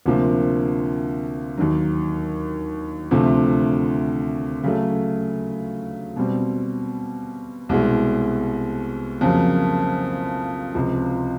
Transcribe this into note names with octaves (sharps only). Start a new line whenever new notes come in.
D2 C3 F3 A#3
D#2 D#3 F#3
D2 C3 F3 A3
C#3 F#3 A3
B2 G3 C4
C2 B2 G#3
F2 C#3 F#3 A#3
C#2 C3 F3